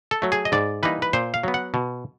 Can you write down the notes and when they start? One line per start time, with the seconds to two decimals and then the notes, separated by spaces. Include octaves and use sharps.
0.11 A4
0.22 F#3 A3
0.32 G#4
0.45 D#5
0.52 G#2 D5
0.83 E3 G3 A#3 D#4 B4
1.02 B4
1.13 A#2 C5
1.34 F5
1.43 F#3 B3
1.54 F#5
1.74 B2